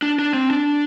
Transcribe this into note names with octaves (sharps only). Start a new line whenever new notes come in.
D4
D4
C4
D4